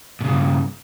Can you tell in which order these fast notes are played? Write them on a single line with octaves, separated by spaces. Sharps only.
A#2 C#3 G2